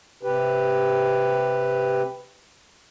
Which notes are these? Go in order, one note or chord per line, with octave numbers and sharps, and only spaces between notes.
C3 G4 B4